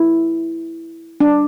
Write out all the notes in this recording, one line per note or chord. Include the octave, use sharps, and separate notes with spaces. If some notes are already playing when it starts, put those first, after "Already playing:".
Already playing: E4
D4